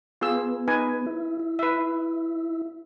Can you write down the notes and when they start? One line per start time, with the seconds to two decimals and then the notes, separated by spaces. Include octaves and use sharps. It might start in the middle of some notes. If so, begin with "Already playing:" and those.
0.21 B3 F4 G#4 E6
0.68 D#4 B4 G#5
1.06 E4
1.39 E4
1.59 B4 E5